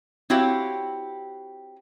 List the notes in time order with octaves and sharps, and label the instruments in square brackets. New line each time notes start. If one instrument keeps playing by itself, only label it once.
[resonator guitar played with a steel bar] C4 E4 F#4 G4 C#5 F5